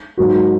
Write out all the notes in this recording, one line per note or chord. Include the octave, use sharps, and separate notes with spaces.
G#2 F#3 A#3 F#4